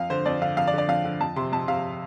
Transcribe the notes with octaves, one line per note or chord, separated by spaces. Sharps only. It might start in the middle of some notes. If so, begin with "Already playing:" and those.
Already playing: F2 F5
D3 C5
F2 D5
D3 F5
F2 F5
D5
D3
D5
F2 F5
D3
F2 A5
C3 C6
F2 A5
C3 F5